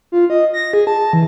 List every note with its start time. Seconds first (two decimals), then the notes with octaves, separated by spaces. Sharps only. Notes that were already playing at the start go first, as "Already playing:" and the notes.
0.12 F4
0.30 D#5
0.54 A#6
0.73 G#4
0.87 A5
1.13 E3